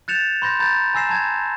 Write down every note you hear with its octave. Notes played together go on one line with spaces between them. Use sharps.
F#6 G6 A6 C#7 E7 F7
B5 C6 G6 A#6
A#5 B5 G6 A6
G#5 A#5 E6 A#6 C7 E7
A5 A#5 G#6